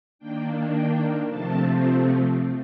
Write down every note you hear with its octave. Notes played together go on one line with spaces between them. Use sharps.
D#3 A#3 D4 G5
G5
C3 F3 A3 C4 A5